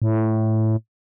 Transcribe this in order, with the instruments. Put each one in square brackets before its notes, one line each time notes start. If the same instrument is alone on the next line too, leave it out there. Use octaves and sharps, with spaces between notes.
[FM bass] A2